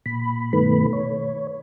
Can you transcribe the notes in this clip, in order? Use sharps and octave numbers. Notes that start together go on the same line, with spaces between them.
A#2 B5
G2 B2 D#3 A3 B4 B5
C#5